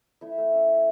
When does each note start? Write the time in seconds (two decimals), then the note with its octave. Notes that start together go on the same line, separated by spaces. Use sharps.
0.21 A3 E4 E5
0.38 A3
0.53 C#4
0.69 E4